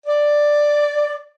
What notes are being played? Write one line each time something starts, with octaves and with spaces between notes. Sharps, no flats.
D5